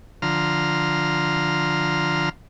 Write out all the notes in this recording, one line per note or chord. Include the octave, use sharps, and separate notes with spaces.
D3 F3 A#5 C6 F6